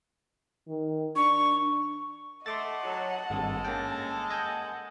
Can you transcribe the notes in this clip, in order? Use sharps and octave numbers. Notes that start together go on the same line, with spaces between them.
D#3
D4 C#6
A3 D#5 F#5 C6 D6 A6
F#3 A5
G#1 G2 G#3 A4
A#3 C#4 G5
D#5 F#5 G#5 G6